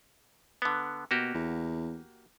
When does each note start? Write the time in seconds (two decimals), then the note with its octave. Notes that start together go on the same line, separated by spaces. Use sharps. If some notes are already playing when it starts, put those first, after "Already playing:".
0.62 D3 B3
1.11 B2 A#3 F#4 G4
1.34 E2